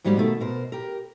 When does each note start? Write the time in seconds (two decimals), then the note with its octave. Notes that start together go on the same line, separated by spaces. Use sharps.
0.04 G#2 F#3 G3 A#3 C4 D#4
0.17 B2 D#3 A3
0.40 B2 A#4 C5
0.72 G4 A#4